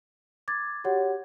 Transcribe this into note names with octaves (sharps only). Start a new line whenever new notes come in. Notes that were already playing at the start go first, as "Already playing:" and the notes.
D6 G#6 A6
F#4 G4 C#5 F#5